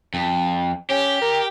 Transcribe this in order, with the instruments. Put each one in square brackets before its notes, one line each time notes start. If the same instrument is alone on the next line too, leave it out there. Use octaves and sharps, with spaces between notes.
[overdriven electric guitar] F2
[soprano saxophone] C#4 [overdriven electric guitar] G4
[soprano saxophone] A#4